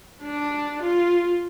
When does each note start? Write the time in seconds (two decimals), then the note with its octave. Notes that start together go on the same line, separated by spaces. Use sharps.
0.23 D4
0.83 F4